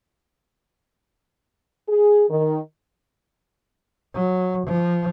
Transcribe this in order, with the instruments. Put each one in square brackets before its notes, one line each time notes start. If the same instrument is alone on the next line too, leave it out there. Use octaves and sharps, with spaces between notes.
[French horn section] G#4
D#3
[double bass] F#3
F3